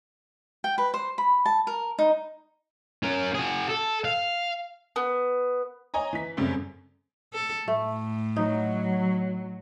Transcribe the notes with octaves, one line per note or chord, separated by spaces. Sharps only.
G5
B4
C5
B5
A5
A#4
D#4
C#4 A#4
F#4 G#4
A4
F5
B3
C#5 D#5 G#5 A#5
E3 B6
F#2 C#3 G3 A3 C4
A4
A2 A3
F#3 D#4